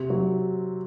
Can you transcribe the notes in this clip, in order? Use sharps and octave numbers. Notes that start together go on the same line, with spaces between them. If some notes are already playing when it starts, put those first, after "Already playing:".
Already playing: C3
F#3